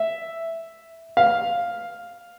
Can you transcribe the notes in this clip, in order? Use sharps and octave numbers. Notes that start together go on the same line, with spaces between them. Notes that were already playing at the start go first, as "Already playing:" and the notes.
Already playing: E5
F5